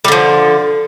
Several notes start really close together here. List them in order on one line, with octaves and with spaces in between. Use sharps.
G3 D3 F3